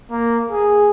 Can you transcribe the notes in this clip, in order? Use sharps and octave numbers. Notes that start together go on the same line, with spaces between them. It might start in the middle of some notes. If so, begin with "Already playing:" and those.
A#3
G#4